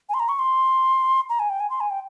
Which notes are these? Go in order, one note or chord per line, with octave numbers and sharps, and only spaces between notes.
G#5
C6
A#5
C#6
C6
A#5
G#5
G5
G#5
C6
G#5
G5